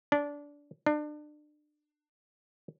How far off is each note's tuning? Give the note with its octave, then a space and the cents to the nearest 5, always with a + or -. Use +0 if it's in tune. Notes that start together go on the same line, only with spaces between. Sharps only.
D4 -20
D4 +30